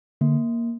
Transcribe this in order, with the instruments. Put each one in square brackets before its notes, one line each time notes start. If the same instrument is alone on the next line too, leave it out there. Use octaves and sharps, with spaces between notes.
[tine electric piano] D3 [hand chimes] A#3